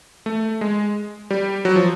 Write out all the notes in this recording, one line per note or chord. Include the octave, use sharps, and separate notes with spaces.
A3
G#3
G3
F#3
F3